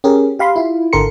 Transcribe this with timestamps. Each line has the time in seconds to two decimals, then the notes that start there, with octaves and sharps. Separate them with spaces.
0.04 C#4 G4 G#4 A#4
0.39 G4 F5 B5 C6
0.56 E4 F4
0.93 G#1 D3 A4 A#4 C6 C#7